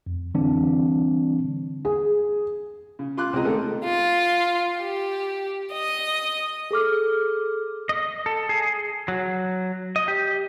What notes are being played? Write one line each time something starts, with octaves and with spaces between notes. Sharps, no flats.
F2
D3 E3 G3 C4 D4
G#4
C#3
F4 C6 D6 F#6
C#2 C4 G#4 D#5 A#5
D#3 A3 C4 G#4 A4
F4
G4
D#5
G#4 A4 D6 F6
D#5
A4
G#4
F#3
D#5
G4